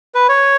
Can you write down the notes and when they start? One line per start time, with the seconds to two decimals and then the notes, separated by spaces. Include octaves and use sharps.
0.15 B4
0.29 C#5